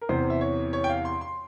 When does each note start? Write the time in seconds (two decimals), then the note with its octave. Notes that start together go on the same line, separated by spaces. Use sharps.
0.01 A#4
0.09 E2 C3 E3 C5
0.30 E5
0.41 C#5
0.73 C#5
0.84 G5
0.89 F5
1.05 C6
1.21 C6